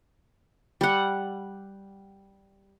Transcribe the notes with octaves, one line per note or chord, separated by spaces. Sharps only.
G3 F#5